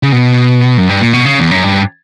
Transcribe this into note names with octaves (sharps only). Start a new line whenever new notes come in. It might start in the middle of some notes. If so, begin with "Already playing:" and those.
C#3
B2
F#2
G2
A#2
B2
C#3
E2
F#2
G2